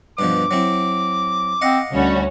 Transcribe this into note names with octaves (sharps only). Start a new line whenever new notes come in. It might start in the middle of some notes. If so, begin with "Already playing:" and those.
G2 B2 F3 D6
F#3 C4 E4
C4 D#5 F5 F#5
D2 G3 C#4 F#4